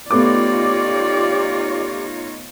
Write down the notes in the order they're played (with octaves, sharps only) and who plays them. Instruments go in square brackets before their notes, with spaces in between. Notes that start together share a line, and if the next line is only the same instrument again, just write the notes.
[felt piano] A3 B3 D6 [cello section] D#4 F4 C#5 [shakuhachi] G4 [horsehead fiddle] D5